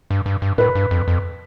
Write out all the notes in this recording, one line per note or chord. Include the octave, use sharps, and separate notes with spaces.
G2
G2
G2
A2 B4
G2
F2
F2